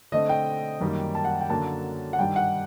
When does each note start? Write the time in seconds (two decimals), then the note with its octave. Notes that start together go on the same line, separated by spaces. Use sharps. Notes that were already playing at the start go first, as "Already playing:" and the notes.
0.12 D3 A3 C4 D#5
0.29 G5
0.80 F#2 D#3 G3 A#3
1.15 A5
1.25 F#5
1.41 G5
1.49 F#2 D3 F#3 A#3 A5
2.13 F#5
2.19 G2 D#3 G3 G5
2.36 F#5